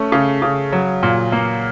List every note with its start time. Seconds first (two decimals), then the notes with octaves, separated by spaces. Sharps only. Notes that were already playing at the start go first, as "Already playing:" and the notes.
Already playing: A3 C#4
0.12 C#3
0.42 C#3
0.72 F#3
1.03 A#2
1.32 A#3